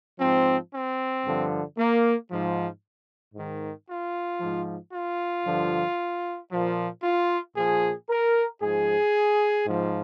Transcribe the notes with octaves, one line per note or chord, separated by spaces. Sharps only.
G#2 F3 C4
C4
G2 D3 F3
A#3
G#2 F3
G#2 D#3
F4
G#2 F3
F4
G2 D3 F3
A#2 F3
F4
A#2 F3 G#4
A#4
G#2 F3 G#4
G#2 F3